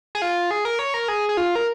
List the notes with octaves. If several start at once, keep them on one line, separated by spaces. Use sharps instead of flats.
G#4
F4
G#4
A#4
C#5
A#4
G#4
G#4
F4
A#4